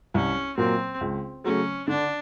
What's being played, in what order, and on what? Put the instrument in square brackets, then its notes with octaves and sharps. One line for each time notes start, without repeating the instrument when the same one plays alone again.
[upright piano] C2 [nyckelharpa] C#4
[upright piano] A#2 F#3 A#3 [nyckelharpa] C4
[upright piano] C#2
[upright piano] C#3 F#3 A3 [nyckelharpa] C#4
[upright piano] D3 [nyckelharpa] D4